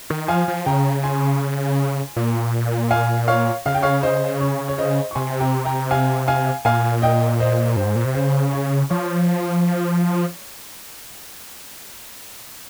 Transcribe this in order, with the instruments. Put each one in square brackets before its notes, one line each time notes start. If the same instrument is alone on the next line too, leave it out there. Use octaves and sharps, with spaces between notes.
[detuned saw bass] D#3
[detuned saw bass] F3 [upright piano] F5 G#5
[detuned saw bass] F3
[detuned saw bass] C#3 [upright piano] G5 A#5
[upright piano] G#5 C6
[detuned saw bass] A#2
[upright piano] F5 G#5
C#5 F5
[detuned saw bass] C#3 [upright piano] F5
[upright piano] G5
C#5 F5
C5 D#5
C#5
C#5
C5 D#5
C#6
[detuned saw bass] C3 [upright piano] G#5 C6
[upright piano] G5 A#5
G5 A#5
F5 G#5
F5 G#5
[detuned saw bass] A#2 [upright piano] F5 G#5
[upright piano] D#5 G5
C5 D#5
[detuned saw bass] G2 [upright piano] C5
[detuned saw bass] G#2
A#2
C3
[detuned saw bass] C#3 [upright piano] C5
[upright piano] C#5
[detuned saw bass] F3 [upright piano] C#5